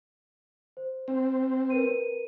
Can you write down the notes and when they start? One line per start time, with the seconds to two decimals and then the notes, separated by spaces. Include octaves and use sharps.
0.77 C5
1.08 C4
1.70 A#4 B4 D#7